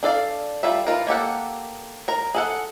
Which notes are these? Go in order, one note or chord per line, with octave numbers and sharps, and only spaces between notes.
D4 A4 D5 F5
G3 F4 A4 E5
E3 F4 A#4
A#3 G4 A4 F#5
A#4 A#5
G#4 A4 F#5